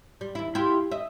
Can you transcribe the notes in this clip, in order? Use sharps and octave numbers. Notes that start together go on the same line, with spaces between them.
G3
D#2 E4
E4 F4 G4
D#5 E5